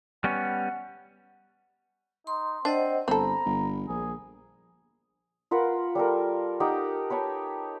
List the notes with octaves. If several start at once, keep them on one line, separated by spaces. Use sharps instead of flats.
G3 B3 C#4 F#5
D#4 C6
C4 D4 C5 D#5 F#5
G1 C4 A4 A#5 B5
G1
A#1 G#4
F4 A#4 B4 F#5
G3 A4 A#4
D#4 G4 F#5 G5
B4 C#5 G5 A5